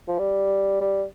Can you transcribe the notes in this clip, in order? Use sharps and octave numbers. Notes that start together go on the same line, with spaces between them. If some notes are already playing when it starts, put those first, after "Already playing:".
F3
G3
G3